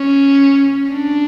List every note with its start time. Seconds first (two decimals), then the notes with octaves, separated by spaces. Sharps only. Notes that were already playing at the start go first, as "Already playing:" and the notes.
Already playing: C#4
0.91 D4